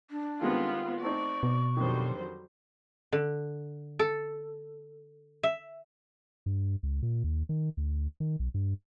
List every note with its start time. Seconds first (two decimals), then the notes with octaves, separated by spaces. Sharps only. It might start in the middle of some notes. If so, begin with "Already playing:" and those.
0.11 D4
0.41 D#3 G3 G#3 B3 C4 F4
1.02 A3 C4 D#4 D5 C#6
1.43 B2
1.77 F2 D3 D#3 F#3 G3 C5
3.12 D3
3.99 A4
5.43 E5
6.46 G2
6.83 C#2
7.02 A#2
7.24 D#2
7.49 D#3
7.77 D2
8.20 D#3
8.39 B1
8.54 G2